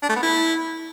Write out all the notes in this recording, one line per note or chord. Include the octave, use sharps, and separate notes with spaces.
D4
A3
B3
E4